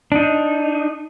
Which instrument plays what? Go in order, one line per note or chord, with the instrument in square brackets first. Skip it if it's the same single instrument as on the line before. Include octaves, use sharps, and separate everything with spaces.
[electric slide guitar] D4 D#4